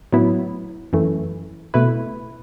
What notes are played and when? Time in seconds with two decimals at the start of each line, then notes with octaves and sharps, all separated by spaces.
0.13 A2 F#3 B3 E4
0.93 F#2 E3 A3
1.74 B2 A3 E4 B4